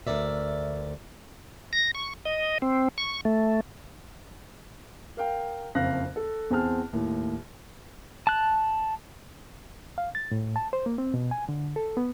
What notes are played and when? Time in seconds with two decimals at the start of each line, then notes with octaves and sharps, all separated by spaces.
0.07 D2 B2 A#4 D5 E5
1.73 A#6
1.95 C#6
2.25 D#5
2.62 C4
2.98 C#6
3.25 A3
5.17 A#4 F5 G5
5.75 F#1 F2 F5 F#6 A#6
6.16 A4
6.50 E2 C4 G#4 A5 F6
6.93 D#2 A2
8.27 A5 F#6
9.98 F5
10.15 A6
10.32 A2
10.56 A5
10.73 C5
10.86 A#3
10.98 C4
11.14 B2
11.31 G#5
11.49 D3
11.76 A4
11.97 B3